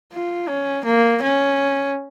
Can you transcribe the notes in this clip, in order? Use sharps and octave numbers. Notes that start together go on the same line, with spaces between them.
F4
C#4
A#3
C#4